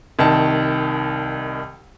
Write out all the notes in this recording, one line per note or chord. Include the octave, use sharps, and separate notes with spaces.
C2 D#3 A5